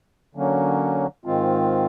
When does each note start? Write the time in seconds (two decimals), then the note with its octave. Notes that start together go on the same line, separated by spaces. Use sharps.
0.35 D3 F#3 A#3 C#4
1.25 G#2 D#3 G#3 C4 F4